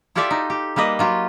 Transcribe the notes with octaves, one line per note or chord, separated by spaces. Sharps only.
E4 F4 G4 A4 D5 E5
D#4
G4
G3 A#3 B4 D#5
F#3 F4 G4